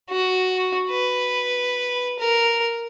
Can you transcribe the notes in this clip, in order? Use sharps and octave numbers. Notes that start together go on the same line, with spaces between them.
F#4
B4
A#4